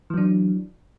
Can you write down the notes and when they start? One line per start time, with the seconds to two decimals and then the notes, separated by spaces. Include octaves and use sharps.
0.10 E3
0.14 F#3
0.17 D4